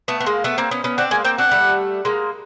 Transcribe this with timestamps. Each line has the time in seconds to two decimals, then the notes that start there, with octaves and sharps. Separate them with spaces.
0.08 A3 B3
0.20 B3
0.26 G#3 A#3
0.44 A3 B3
0.58 A#3 C4
0.71 B3 C#4
0.84 B3 C#4
0.98 C4 D4 F#5
1.11 G#3 A#3 G#5
1.25 A#3 C4 G5
1.38 C4 D4 F#5
1.51 G3 A3
2.05 G#3 A#3